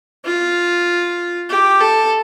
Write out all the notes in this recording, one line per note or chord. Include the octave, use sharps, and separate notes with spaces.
F4
G4
A4